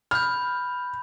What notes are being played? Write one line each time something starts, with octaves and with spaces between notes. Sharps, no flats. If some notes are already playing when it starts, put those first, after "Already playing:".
B5 F6 G6